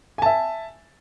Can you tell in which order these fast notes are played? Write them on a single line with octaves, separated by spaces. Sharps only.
G#5 A5 E5